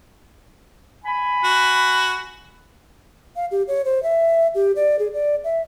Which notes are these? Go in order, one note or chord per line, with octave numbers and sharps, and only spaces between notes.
G#5 B5
F#4
F5
G4
C#5
C5
E5
G4
D5
G#4
D5
E5